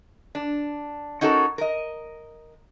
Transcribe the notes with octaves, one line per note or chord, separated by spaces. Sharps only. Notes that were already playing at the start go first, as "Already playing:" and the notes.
D4
C#4 D#4 F#4 A4 A#4
A#4 D#5